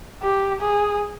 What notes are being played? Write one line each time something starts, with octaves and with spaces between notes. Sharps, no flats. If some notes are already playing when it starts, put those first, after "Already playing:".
G4
G#4